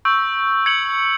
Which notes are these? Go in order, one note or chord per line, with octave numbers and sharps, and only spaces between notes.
C#6 E6 G6
G#6 C#7 F#7